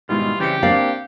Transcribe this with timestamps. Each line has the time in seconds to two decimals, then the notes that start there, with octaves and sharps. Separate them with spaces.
0.09 G#2 B2 D#3 G3 E4 F4
0.40 C#3 E3 G3 C4 G4 C#7
0.63 A#3 C4 D4 D5 F5